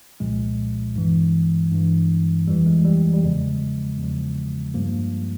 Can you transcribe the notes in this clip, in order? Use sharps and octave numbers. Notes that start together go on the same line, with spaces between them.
C2 A#2 F3 G#3
G2 E3
G2 E3
F2 E3 G3
G#3
G3
G3
E2 C#3 F3 G#3
E2 C#3 F3
G2 F3 G3 A#3